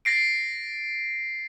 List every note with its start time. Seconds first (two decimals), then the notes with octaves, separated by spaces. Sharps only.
0.05 A6 A#6 C7 D7